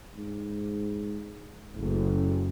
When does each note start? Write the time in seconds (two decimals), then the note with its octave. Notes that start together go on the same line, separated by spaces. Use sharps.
0.15 G#2
1.76 F#1 A2